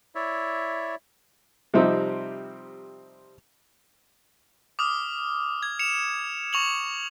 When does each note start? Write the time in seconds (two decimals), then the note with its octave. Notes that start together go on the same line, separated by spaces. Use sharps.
0.15 E4 C#5 D5 E5
1.74 C3 F3 G3 C4 D#4 G4
4.79 D6 D#6 F6
5.63 G#6
5.79 C#7 E7 F7
6.53 C#6 F7 F#7